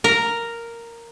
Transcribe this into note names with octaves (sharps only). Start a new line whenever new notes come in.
A#4